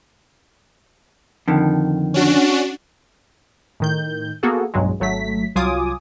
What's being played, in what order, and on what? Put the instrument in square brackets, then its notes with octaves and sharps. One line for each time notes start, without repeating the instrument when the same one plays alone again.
[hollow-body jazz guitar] F2 D3 D#3
[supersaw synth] C#4 D4 F#4
[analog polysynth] A2 D#3 G6
A#3 B3 F#4 G#4 A4
B1 E2 G2 F#3 G#3
G#1 F#3 A3 B6
C2 F#3 F4 G#5 D6 D#6